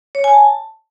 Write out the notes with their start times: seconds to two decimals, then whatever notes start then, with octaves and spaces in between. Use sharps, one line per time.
0.15 C#5
0.24 G#5
0.33 A5